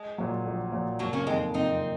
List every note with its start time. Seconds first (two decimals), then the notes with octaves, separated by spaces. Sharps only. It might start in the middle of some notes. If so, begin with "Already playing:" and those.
Already playing: G#3
0.18 A#2 F#3
0.46 A#1
0.72 A#2 F#3
0.99 F#1 F#3 A#3
1.13 A#3 C#4
1.27 F2 D#3 G#3 A#3 C4
1.54 F#1 C4 D#4